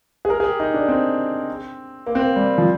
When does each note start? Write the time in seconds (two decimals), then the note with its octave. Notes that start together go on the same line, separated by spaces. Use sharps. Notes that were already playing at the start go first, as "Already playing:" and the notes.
0.25 G#4
0.30 A#4
0.40 G#4
0.45 G4
0.60 D#4
0.74 D4
0.88 C4
2.06 A#3
2.15 C4
2.23 A#3
2.36 G3
2.58 F3